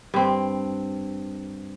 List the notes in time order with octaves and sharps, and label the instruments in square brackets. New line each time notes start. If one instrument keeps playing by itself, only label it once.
[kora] G2 C4